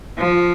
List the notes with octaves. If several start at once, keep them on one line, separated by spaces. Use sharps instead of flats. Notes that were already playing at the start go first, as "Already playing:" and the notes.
F3